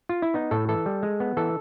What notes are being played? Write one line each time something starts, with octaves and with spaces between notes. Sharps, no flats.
F4
E4
B3 D#4
A2 A4
E3 A4
G3
G#3
B3
E3 A4